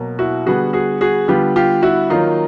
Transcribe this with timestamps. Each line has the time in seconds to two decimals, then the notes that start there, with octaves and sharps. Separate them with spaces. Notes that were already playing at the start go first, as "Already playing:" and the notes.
Already playing: B2 F#3 A#3
0.19 E4 F#4
0.46 D3 G3 B3 F#4 G#4
0.73 F#4 G#4
1.01 F#4 G#4
1.28 D3 G3 B3 F4 G4
1.56 F4 G4
1.83 E4 F#4
2.10 D#3 F#3 A#3 D#4 F4